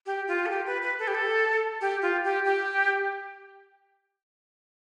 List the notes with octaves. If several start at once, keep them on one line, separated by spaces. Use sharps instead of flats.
G4
F4
A4
G4
B4
B4
A4
G4
A4
G4
F4
G4
G4